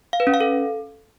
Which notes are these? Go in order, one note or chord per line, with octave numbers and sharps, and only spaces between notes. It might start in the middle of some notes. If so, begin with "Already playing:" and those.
F5
B4
C#4
F5
A4